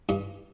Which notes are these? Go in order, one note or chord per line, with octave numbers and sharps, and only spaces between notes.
G2